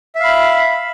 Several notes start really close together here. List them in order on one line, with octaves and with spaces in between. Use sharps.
E5 F5 B5